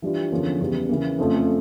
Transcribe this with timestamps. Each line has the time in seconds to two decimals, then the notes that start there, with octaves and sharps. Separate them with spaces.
0.02 E3 G3 D4 F4
0.31 E2 D3 F3 A#3 C#4
0.60 E2 C#3 G3
0.89 C#3 E3 A#3
1.18 F2 C#3 F3 A3